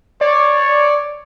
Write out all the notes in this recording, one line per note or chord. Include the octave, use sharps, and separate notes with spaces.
C#5 D5